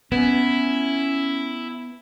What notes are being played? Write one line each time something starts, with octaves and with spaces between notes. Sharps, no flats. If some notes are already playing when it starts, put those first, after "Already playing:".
B3 C#4 E4